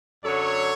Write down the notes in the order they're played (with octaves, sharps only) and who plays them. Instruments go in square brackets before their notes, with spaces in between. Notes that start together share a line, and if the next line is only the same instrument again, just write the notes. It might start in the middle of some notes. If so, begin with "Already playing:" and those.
[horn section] F#2 D3 F#3 A4 C#5